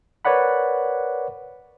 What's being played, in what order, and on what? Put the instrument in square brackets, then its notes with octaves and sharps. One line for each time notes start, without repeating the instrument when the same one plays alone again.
[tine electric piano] A#4 B4 C#5 D5 F#5 B5